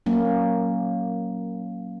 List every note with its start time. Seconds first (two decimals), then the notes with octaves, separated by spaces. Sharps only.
0.06 F#3 A#3 C#4